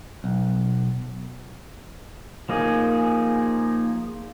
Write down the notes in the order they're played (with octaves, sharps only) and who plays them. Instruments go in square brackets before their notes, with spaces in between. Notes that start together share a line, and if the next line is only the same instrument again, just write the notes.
[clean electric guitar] B1
[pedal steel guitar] F3 A#3 D#4 G#4